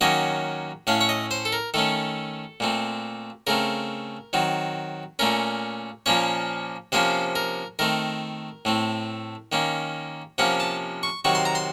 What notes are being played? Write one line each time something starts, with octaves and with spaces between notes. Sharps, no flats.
D#3 F#3 A#3 C#4 D#5
A2 A3 C#4 F5
C#5
D#5
C5
A4
A#4
D#3 A3 C#4 A4
A#2 A3 C4
C#3 A3 C4 A#4
D#3 F#3 C4
A#2 A3 C#4 A#4
A#2 F3 A#3 C#4 C#5
C3 F3 A#3 C#4 C5
A#4
D#3 A3 C4 A#4
A2 A3 C4
D#3 A#3 C#4
C3 F3 A#3 C#4 F#5
A5
C#6
C3 D#3 F#3 C4 C#6
C6
A#5
C6